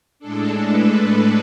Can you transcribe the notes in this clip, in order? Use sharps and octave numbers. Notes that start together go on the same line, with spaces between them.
A2 G#3 D4 A4
B4